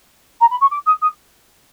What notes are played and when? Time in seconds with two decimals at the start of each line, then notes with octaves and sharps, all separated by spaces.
0.40 A#5
0.50 B5
0.61 C#6
0.70 D6
0.86 D#6
1.02 D#6